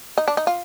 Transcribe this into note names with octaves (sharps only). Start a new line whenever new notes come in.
D#4
D4
D#4
F4